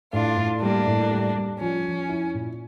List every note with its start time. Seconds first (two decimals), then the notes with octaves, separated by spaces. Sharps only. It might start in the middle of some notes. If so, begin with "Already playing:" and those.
0.13 A2 D4 F4
0.37 A2
0.62 G3 A#3 D4
0.86 A2
1.11 G3
1.36 G3
1.60 F3 C#4
1.85 F3
2.09 E4
2.34 A#2